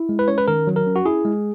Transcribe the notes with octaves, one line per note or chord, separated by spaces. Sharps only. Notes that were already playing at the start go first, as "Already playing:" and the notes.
Already playing: E4
G#3
B4
C#4 C#5
B4
D#3 A#4
F#3
A#4
C#4
F#4
E4 G#4
G#3